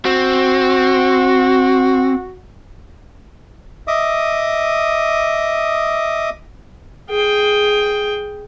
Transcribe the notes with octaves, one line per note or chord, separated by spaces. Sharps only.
C4 F#4
D#5 E5 D6 D#6
G#4 G5